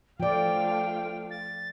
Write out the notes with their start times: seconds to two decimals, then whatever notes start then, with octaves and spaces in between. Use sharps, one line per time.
0.20 F3 A3 F4 D5 F5 G5
1.31 A6